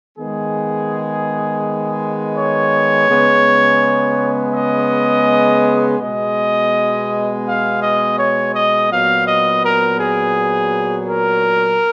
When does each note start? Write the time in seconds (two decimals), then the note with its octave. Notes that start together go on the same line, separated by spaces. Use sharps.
0.17 D#3 G#3 B3 G#4
2.35 C#5
3.08 C#3 G#3 B3
4.54 D#5
5.99 B2 G#3 B3 D#5
7.44 F5
7.81 D#5
8.17 C#5
8.53 D#5
8.89 A#2 F#3 B3 F5
9.26 D#5
9.63 A#4
9.99 G#4
11.08 A#4